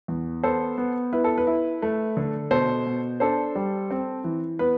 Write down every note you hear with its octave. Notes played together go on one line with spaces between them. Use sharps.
E2
B3 A4 C5
B3
E4 B4
A4
B4
E4
A3
D3
B2 A4 C5
B2
D4 A4 C5
G3
C4
E3
B3 B4